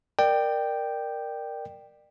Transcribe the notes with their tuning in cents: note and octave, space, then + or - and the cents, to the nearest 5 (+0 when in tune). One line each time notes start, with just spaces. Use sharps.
A#4 +0 D5 +30 G5 +0